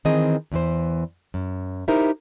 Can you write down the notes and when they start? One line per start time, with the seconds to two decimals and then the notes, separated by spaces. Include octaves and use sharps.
0.05 D#3 E3 C4 G#4 D#5
0.52 E2 E3 C5
1.34 F#2
1.88 D#4 E4 G4 A#4 C5 E5